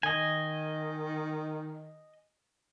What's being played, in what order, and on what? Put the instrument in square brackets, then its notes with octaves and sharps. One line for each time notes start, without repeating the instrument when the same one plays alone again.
[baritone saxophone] D#3 [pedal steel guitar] D#5 G#5